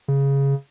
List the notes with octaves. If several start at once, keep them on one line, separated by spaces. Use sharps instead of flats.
C#3